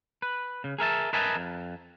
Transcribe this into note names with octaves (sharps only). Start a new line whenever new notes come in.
B4
C#3
G#4 A#4 E5 A5
A#4 B4 D#5 E5 G#5 A5
F2